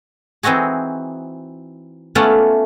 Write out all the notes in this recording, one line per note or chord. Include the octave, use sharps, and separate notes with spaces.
E3 C4 D#4 F#4 G#4
A3 B3 C#4 F4 D5 F#5